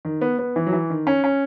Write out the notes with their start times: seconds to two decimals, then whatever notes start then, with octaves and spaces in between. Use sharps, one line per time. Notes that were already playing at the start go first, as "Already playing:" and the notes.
0.05 D#3
0.21 B3
0.39 B3
0.56 E3
0.67 F#3
0.73 E3
0.90 D#3
1.07 C#4
1.24 C#4